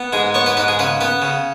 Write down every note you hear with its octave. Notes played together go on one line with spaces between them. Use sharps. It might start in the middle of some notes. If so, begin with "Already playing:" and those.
Already playing: B3
G#2 G#4
B3 C#5
B4
G#2 B4
G#4
C#3 B4
B3 B4
C#3